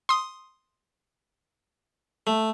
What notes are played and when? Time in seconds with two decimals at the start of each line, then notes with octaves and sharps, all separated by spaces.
0.09 C6 D#6
2.27 A3